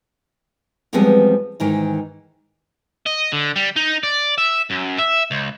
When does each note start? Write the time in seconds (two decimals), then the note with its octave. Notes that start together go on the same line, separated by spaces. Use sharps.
0.93 E2 F3 G3 G#3 B3 C4
1.60 G#2 D#3 E3
3.06 D#5
3.32 D3
3.56 G3
3.76 D#4
4.03 D5
4.38 E5
4.70 F#2
4.98 E5
5.31 C#2